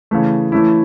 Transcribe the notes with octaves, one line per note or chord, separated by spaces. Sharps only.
C#3 E3 A3
E3 A3 C#4 E4